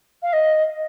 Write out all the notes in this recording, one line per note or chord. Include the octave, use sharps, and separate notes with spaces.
F5
D#5